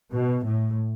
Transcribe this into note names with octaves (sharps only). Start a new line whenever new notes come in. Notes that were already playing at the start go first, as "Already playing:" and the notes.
B2
A2